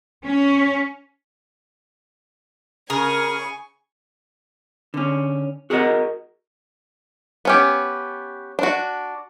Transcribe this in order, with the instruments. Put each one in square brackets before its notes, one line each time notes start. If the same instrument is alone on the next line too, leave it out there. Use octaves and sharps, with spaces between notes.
[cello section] C#4
[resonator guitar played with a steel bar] C#3 [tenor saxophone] G#4 [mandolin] A#4 [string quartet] G#5 C#6
[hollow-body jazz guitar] D3 C#4
F#4 G#4 A#4 B4 D#5 F#5
[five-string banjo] B3 C#4 G4
D4 F#4